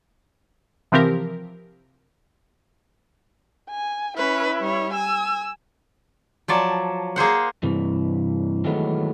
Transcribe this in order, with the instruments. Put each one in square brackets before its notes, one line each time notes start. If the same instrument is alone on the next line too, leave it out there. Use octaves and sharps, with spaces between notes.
[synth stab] C3 E3 F3 C4 G4 A#4
[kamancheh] G#5
[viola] C#4 B4 [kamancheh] E4
[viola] G3 C#5
[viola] G#5 [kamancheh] E6
[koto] F3 F#3 D5 A5
A#3 G#4 C5 F#5
[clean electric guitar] G2 C3 E3
D#3 E3 F#3 G#3 A3 B3